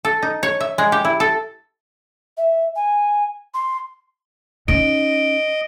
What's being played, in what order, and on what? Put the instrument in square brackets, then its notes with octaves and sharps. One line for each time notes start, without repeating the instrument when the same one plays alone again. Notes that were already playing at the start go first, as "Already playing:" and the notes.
[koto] A4
D#4
C#5
E5
G#3
G4
E4
A4
[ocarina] E5
G#5
C6
[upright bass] C#4 D#4 [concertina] D#5 [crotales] D7